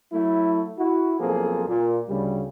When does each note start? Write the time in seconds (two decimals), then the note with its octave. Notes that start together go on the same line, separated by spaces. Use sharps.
0.12 F#3 A3 E4
0.78 E4 F#4
1.20 B1 F3 A#3 C4 G#4 A4
1.68 A#2
2.08 D2 C#3 G3